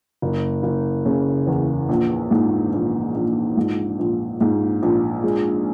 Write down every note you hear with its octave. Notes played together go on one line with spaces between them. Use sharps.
F#1
F#1
C#3
E2
A#1
G#2
A#1
A#1
G#2
A#1
G#2
A#1
G#3